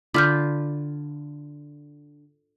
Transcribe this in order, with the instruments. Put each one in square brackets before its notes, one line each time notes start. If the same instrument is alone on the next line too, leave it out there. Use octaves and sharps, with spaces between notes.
[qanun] D3 F4 B5 [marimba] D6 F6 G6